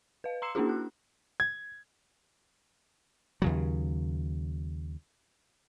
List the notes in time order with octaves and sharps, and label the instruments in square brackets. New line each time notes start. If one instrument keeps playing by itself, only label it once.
[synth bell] B4 F5
A#5 C6 E6 C7 C#7 E7
A#3 C#4 D4 E4 F#4 G#4
F#6
[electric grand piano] G#6
[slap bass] D#2 C#3 F#3